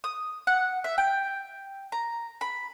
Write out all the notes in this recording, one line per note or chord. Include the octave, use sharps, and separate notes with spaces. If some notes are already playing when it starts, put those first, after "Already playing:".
D#6
F#5
E5
G5
A#5
B5